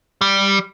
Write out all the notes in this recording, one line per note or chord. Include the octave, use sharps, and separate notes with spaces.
G3